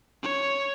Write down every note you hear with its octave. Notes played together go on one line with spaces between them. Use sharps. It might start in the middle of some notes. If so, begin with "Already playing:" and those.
C#5